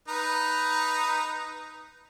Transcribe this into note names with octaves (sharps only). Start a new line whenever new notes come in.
D#4 B4 A#5